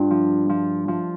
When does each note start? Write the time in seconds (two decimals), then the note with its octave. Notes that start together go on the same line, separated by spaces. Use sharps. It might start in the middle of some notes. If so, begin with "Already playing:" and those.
Already playing: G2 D4 F4
0.11 F3
0.49 F3
0.88 F3